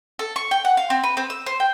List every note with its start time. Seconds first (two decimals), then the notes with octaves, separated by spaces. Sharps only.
0.19 A4
0.36 C#6
0.51 G5
0.65 F#5
0.77 F5
0.90 C4
1.04 B4
1.17 C4
1.30 E6
1.46 C5
1.60 G5